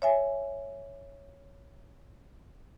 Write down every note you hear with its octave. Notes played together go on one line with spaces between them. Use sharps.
C#5 E5 G#5